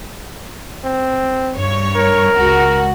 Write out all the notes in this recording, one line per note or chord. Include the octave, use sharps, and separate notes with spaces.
C4
G2 C#5
A#4
C#2 F#4